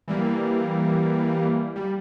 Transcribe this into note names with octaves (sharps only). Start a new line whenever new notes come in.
E3 G3 A#3
G3